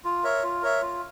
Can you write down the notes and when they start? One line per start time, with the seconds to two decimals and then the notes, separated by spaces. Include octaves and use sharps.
0.05 F4
0.23 A#4 C#5 E5
0.43 F4
0.62 A#4 C#5 E5
0.82 F4